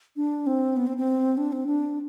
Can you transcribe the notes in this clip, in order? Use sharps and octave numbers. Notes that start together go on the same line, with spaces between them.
D4
C4
B3
C4
C4
D4
C4
D4